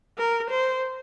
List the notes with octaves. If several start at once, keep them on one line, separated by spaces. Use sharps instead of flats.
A#4
C5